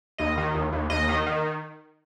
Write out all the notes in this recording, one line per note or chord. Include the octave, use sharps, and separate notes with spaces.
D#2 D#5
D#3
D#2
D#2
D#2 D#5
D#3
D#3